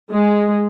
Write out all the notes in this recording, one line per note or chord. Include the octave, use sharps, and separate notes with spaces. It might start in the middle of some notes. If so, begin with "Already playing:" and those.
G#3